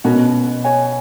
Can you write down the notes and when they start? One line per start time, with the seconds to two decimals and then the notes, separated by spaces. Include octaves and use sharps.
0.04 B2 C#4 F#4 A#4
0.64 F#4 C#5 G#5